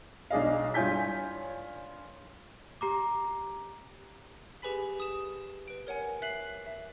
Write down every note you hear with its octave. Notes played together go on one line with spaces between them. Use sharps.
B1 D4 G#4 D#5 F5
G2 F4 C#5 G#5 G6 B6
G4 A#5 D6
G4 G#4 B4 G#5 B5 B6
D#6 E7
B4 D7
A#4 C#5 F#5 G#5
E5 F#6 C7 F#7
E5